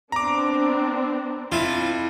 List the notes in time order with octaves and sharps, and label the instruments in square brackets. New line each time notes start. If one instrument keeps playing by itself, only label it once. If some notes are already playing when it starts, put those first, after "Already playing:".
[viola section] B3 C4 D4 [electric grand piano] A#5 D6
[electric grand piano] F2 [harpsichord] E4 F4